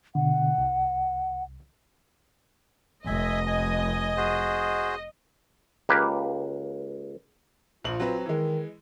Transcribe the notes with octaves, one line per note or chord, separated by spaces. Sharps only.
B2 D3 F#5
C2
F1 D#5 E5 G#5
G#5
F#4 G#4 C5
C#2 A#3 G4 B4
A#1 F3 F4 F#7
F#3 C4 B4
D#3 E3 G#3